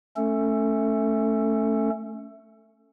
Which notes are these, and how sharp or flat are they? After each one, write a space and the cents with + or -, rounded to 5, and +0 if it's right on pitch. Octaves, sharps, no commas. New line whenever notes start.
A3 +0 C#4 +0 A4 +20